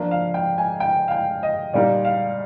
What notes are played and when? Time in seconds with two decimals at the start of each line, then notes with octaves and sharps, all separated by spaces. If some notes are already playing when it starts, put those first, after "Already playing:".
Already playing: F3 A#3 D4
0.11 F5
0.34 G5
0.58 G#5
0.80 G5
1.08 F5
1.11 G5
1.43 D#5
1.73 A#2 G3 A#3 D#4 D5
2.05 F5